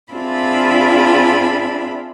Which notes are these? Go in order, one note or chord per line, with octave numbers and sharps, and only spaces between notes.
C4 D4 F4 G#4 E5 B5